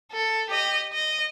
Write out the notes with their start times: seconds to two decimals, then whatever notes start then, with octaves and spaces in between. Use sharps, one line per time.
0.12 A4
0.50 G4 D#5
0.93 D#5